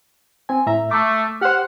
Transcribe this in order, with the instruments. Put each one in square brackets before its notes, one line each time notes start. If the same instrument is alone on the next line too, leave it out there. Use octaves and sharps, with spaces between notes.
[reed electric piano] C4 G#5
A2 E5 A#5
[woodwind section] A3 [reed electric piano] D6
[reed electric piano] G4 C5 [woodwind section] F#5 F6